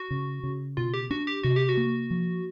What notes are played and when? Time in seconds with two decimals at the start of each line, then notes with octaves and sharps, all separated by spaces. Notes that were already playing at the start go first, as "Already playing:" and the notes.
Already playing: F#4
0.11 C#3
0.43 C#3
0.77 B2 F4
0.94 G4
1.10 D4 F#4
1.27 G4
1.43 C3 F#4
1.56 G4
1.69 F#4
1.77 A#3
2.11 F3